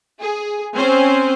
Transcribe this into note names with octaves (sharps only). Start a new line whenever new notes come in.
G#4
C4 C#4 C5 G#5